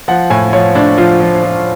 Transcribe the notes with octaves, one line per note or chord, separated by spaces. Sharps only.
F3 F#5
A2 G#5
F3 C#5
A2 D4
F3 F4
F3
F3